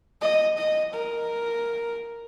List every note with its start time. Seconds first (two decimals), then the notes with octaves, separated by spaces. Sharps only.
0.21 D#5
0.58 D#5
0.94 A#4